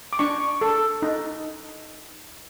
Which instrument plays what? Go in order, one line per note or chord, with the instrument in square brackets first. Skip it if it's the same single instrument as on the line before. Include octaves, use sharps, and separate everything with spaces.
[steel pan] D6
D4 C#6
A4
D#4